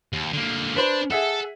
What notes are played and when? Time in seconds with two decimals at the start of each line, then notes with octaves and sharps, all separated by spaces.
0.13 D#2
0.33 D3 A#3
0.76 D4 B4 C5
1.11 G#4 A4 E5 F#5